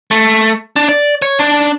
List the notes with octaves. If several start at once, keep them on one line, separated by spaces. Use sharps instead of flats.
A3
D4
D5
C#5
D4